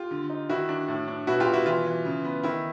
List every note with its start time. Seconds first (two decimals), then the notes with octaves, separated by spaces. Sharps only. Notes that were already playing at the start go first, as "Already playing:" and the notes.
Already playing: F4 G4
0.11 D3
0.30 D#4
0.49 D#3 E4 F#4
0.69 D4
0.88 A2
1.08 D4
1.27 B2 E4 F#4
1.40 F4 G4
1.47 B2
1.53 E4 F#4
1.66 E3 F4
1.86 E3
2.05 C#3
2.24 B3
2.44 D#3 E4